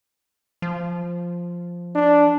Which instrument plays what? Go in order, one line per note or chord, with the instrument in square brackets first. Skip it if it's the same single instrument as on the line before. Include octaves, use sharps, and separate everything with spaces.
[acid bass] F3
[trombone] D4